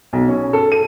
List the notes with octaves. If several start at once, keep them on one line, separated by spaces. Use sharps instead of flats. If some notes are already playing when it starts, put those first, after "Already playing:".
B1
C#4
A4
D#7